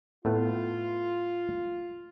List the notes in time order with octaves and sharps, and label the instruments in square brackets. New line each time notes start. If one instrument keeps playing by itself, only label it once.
[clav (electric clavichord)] A2 A3 B3 [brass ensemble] F4